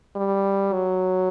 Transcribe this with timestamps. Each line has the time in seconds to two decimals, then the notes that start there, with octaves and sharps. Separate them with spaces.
0.16 G3
0.73 F#3